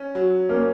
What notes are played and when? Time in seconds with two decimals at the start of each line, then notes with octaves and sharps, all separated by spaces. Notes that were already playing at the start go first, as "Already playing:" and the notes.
Already playing: C#4
0.15 F#3
0.49 A#3 C#4